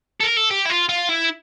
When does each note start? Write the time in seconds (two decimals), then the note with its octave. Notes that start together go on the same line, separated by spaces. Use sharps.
0.20 A4
0.23 A#4
0.37 A4
0.51 G4
0.66 E4
0.70 F4
0.89 F4
1.09 E4